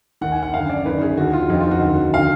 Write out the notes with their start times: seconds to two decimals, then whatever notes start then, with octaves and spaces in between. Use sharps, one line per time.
0.21 D#2 D#3 F#5
0.32 G#5
0.43 F#5
0.54 F#2 D3 F5
0.69 D5
0.86 F#2 D#3 B4
1.02 G#4
1.17 D#2 D3 F#4
1.33 F4
1.50 F2 D3 D#4
1.60 F4
1.71 F#4
1.82 D#2 D3
2.14 D3 F5